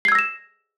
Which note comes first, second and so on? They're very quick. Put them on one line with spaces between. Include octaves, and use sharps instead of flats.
C7 G#6 E6 A#6 E7